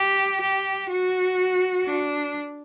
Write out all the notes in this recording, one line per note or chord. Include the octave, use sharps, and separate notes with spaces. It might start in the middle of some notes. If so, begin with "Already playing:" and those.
Already playing: G4
G4
F#4
D4